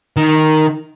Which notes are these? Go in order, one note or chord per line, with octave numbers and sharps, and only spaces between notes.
D#3